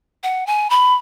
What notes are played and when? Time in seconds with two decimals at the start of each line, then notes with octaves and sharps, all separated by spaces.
0.23 F#5
0.47 G#5
0.70 B5